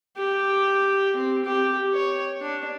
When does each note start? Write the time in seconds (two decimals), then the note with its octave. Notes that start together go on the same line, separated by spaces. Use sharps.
0.17 G4
1.16 C4
1.45 G4
1.93 C#5
2.41 D4